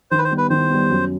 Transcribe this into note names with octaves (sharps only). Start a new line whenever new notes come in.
D#3 C5
B4
C5
G3 B3
B4
D#3 C5
G3 B3
F#2